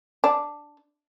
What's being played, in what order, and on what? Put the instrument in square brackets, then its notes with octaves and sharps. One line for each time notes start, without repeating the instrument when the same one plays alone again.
[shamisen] D4